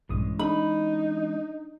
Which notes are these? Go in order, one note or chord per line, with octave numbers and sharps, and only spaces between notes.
A#1 G2 E3 G#3 C#4 D#6
D4 D#4 B5